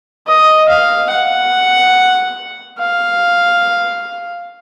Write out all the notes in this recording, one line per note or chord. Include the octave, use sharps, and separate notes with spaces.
D#5
F5
F#5
F5